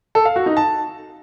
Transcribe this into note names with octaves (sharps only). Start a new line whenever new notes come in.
A4
F5
F#4
D#4
A5